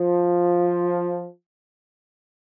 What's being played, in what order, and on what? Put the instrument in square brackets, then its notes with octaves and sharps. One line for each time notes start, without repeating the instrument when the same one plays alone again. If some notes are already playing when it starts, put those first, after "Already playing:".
Already playing: [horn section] F3